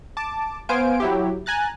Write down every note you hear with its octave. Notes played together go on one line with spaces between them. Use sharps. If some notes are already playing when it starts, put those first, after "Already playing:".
A5 D6
B3 C5 F5 G#5 D7
F#3 E4 G4
G#5 A#5 F#6 A6